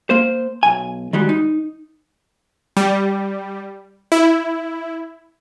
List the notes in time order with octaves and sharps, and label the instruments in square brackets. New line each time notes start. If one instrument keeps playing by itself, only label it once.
[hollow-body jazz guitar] A#3 C5
B1 G#5
D#3 G3 G#3 F#4
D#4
[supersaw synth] G3
E4